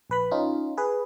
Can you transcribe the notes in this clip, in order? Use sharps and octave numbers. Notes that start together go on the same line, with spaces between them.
A#1 B4 B5
C#4 D#4 F4
G#4 B4